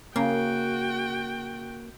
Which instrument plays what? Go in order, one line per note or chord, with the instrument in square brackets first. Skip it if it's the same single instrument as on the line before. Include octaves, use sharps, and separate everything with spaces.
[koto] C#3 [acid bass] A#3 [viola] F#4 G5